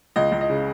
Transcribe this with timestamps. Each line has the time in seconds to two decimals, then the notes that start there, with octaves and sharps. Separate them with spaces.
0.16 C#2 D#5
0.32 C#2
0.41 D#5
0.50 C#3